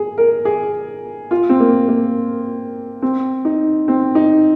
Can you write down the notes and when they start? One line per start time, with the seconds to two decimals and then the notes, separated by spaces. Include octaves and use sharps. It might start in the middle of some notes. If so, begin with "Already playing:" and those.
Already playing: G#4
0.18 A#4
0.45 G#4
1.31 F4
1.49 C4
1.60 A#3
1.88 A#3
3.02 C4
3.45 D#4
3.88 C4
4.15 D#4